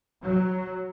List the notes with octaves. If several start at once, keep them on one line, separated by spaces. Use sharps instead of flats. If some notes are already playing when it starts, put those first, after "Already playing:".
F#3